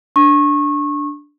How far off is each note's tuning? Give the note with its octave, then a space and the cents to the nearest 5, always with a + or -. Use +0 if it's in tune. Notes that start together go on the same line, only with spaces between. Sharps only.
D4 +0 C#6 -25